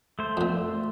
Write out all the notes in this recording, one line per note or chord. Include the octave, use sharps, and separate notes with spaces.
A3 C5
F2 A#2